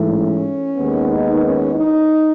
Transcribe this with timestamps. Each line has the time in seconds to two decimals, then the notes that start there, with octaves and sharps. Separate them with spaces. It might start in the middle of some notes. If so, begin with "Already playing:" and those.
Already playing: G#2 E3 A3
0.09 C#4
0.76 D#2 D#3 G#3 B3
1.09 D#4
1.42 C#4
1.76 D#4